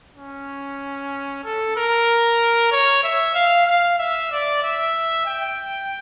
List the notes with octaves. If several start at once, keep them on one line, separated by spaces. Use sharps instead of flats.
C#4
A4
A#4
C#5
E5
F5
F5
E5
D5
E5
G5